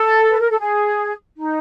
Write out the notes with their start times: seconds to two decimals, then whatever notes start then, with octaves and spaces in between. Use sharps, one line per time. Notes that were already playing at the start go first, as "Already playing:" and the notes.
Already playing: A4
0.30 B4
0.40 A#4
0.50 A4
0.60 G#4
1.37 D#4